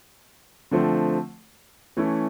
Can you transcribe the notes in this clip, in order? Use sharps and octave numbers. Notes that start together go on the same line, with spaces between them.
D3 F3 A3 C4
E3 A3 C#4 E4